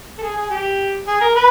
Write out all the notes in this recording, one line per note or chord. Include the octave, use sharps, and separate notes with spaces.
A4
G#4
G#4
G4
G#4
A#4
B4